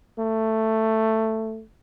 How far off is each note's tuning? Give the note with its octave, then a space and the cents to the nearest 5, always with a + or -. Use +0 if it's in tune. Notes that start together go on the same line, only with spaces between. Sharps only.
A3 +10